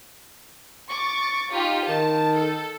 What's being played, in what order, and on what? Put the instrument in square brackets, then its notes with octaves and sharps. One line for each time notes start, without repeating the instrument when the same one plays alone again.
[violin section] C#6 D6 A6
D#4 F4 G4
[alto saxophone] D#3 [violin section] A5
[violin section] A4